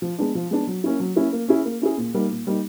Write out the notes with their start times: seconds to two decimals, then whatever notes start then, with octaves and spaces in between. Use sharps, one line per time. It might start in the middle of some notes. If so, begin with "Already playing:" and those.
0.02 F3
0.18 G#3 B3 D4
0.35 F3
0.51 G#3 B3 D4
0.67 F#3
0.84 A#3 C#4 E4
1.00 F#3
1.16 A#3 C#4 E4
1.33 A#3
1.48 C#4 E4 G#4
1.65 A#3
1.82 C#4 E4 G#4
1.98 A#2
2.14 G3 A#3 D#4
2.31 A#2
2.47 G3 A#3 D#4